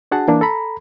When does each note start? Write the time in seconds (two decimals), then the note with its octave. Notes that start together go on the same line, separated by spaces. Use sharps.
0.11 D4 F#4 G#4 F#5 A5
0.28 E3 A#3 D4
0.41 A4 A#5 B5